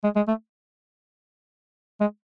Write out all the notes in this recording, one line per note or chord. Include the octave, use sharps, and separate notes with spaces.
G#3
G#3
A3
G#3